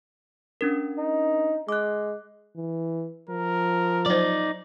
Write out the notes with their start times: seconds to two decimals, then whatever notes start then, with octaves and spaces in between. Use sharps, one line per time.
0.61 C#4 D4 A#4
0.98 D#4
1.69 G#3 D6 F#6
2.56 E3
3.30 F3 A#4
4.06 F#3 D#4 C5 D5